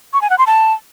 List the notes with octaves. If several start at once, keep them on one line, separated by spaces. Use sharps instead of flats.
C#6
G#5
F#5
C6
A5